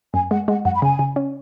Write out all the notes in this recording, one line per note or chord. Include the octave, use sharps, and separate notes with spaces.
F#2 G#5
G#3 F#5
G#3 F#5
F#2 F#5
B5
C#3 G#5
C#3
C#4